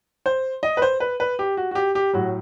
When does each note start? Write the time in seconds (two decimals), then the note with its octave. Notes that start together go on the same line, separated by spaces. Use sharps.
0.26 C5
0.63 D#5
0.77 B4
0.82 C5
1.00 B4
1.20 B4
1.39 G4
1.57 F#4
1.71 F#4
1.75 G4
1.95 G4
2.13 A2 F#3 F#4